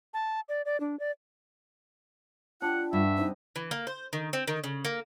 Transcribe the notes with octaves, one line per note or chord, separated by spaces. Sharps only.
A5
D5
D5
D4
D5
D4 F4 G4 F#5
G2 F#4 E5
C3 D#4 E4 D#5
E3
A#3
C5
D#3
C4
D#3
C#3
A#3